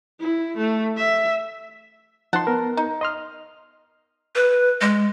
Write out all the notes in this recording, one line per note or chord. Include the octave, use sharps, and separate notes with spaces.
E4
A3
E5
F3 D#4 F#5 A5 C6
B3 A#4
D#4
D#5 C6 F6
B4
G#3